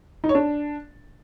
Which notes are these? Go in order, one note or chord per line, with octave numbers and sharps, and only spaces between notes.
D#4
C#5
D4